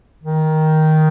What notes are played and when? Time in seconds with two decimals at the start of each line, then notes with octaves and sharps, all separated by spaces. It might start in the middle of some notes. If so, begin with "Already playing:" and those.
0.24 D#3